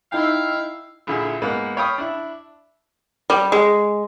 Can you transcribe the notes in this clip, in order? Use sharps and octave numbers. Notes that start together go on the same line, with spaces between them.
D#4 E4 E5 F5 G5
A#1 D3 E4 G#4 E5
G#2 A#3 B3
C#5 F5 G5 B5 D#6
D4 E4
G3
G#3